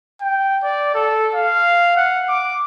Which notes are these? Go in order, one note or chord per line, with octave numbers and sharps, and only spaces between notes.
G5
D5
A4
F5
F#5
D6